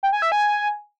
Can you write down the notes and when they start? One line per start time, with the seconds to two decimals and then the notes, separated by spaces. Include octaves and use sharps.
0.03 G5
0.13 G#5
0.22 E5
0.32 G#5